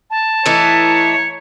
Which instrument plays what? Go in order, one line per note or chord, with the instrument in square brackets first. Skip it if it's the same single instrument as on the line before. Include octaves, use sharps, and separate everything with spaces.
[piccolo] A5
[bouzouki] E3 A3 D#4 [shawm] C#5